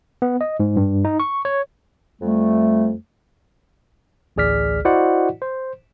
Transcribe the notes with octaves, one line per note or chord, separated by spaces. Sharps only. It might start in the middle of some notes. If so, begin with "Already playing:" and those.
B3
D#5
G#2
G2
D#4
C#6
C#5
F2 G3 A3
A1 D2 G#4 D5 F6 B6
E4 F#4 C5 D5 D#5 F#5
C5